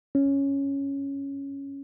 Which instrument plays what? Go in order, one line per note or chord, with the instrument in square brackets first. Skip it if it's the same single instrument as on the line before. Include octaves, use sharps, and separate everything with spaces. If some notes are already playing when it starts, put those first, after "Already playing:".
[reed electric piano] C#4